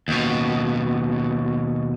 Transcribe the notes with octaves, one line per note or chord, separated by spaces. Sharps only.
D#2 B2